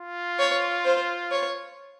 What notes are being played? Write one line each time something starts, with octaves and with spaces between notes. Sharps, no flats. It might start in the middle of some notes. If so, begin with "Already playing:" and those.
Already playing: F4
C#5
C5
C#5